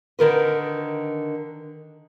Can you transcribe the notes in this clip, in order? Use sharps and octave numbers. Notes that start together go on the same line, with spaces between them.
D3 D#3 A#4 B4